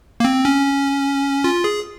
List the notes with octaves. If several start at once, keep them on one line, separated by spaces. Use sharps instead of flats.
A#3
C4
C#4
F4
G#4